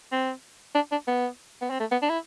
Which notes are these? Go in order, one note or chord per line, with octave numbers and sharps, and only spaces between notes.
C4
D4
D4
B3
B3
C4
A3
B3
D4
E4